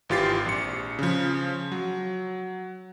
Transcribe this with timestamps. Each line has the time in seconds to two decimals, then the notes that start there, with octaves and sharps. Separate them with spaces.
0.09 G#1 E3 F4 G4 A6 C7
0.46 A#1 C#7
0.99 C#3 F3
1.72 F#3